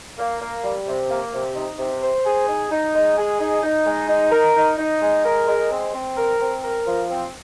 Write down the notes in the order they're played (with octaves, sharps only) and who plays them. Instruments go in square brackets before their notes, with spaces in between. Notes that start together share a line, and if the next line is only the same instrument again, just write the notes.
[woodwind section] A#3
A#3
G3
C3
A#3
C3
D#4
C3
C5
G#4
D#4
D#4
G#3
G#4
D#4
D#4
G#3
D#4
A#4
D#4
D#4
G#3
A#4
G#3
C4
C4
A#4
C4
A#4
F3
C4